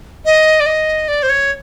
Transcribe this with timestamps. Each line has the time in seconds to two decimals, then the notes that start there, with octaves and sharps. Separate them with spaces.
0.25 D#5
0.60 D5
0.66 D#5
1.08 D5
1.23 C5
1.29 C#5